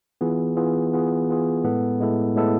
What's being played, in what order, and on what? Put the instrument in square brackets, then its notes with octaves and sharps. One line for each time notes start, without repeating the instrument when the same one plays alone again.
[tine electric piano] E3 B3 F4 G#4
E3 B3 F4 G#4
E3 B3 F4 G#4
E3 B3 F4 G#4
A2 G#3 B3 E4 A4
A2 G#3 B3 E4 A4
A2 G#3 B3 E4 A4